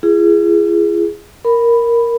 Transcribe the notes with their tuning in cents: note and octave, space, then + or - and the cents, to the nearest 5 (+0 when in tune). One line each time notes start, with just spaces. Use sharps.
F4 -45 G#4 +0
A#4 +0 B5 +0